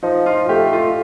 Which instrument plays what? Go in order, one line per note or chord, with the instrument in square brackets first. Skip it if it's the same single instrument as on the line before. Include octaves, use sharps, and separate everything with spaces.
[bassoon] F3 [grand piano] D#4
[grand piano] F4
[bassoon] A3 [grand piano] G4
[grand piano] F4